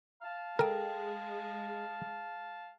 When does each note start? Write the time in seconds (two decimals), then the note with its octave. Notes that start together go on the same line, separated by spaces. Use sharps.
0.22 F5 A5
0.59 G#3 A4 A#4 G5